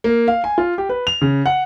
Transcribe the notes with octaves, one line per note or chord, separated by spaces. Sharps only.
A#3
F5
G#5
F4
G4
B4
F7
C#3
F#5